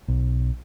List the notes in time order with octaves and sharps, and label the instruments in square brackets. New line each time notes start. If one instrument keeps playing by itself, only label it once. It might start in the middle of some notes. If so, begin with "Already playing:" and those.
[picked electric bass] B1